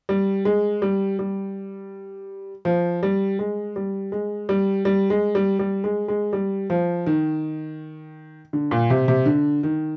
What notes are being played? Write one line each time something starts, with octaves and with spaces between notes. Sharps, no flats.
G3
G#3
G3
G3
F3
G3
G#3
G3
G#3
G3
G3
G#3
G3
G3
G#3
G#3
G3
F3
D#3
D3
A#2
C3
C3
D3
D#3